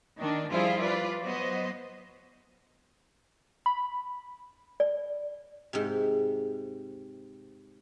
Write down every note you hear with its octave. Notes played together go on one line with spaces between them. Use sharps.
D#3 D4
F3 G3 E4 F4 G#4 C5
F4 B4 D5
F#3 B3 C5 D#5
B5
D5
G#2 C3